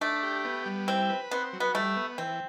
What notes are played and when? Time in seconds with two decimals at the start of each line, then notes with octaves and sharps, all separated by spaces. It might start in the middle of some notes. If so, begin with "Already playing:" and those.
0.01 A3 D4
0.23 G4
0.45 B3
0.66 G3
0.88 C4 E4
1.09 B4
1.31 B3 C4
1.53 F#3
1.60 B3
1.75 G3 A3
1.96 B3
2.18 E3 C4